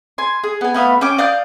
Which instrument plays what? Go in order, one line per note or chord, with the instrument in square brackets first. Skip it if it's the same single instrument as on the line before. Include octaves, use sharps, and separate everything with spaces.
[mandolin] G#5 C6
G#4
B3 G#5
A3 B3 F5 B5
C#4 G5 D6
D5 F5 D#6 G6